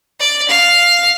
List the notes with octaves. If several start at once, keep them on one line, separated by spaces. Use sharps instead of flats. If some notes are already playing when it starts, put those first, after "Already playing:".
D5
F5